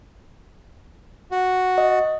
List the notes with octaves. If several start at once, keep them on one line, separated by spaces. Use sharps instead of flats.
F#4
D#5